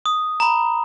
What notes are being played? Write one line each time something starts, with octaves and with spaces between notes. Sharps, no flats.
D#6
A#5 B5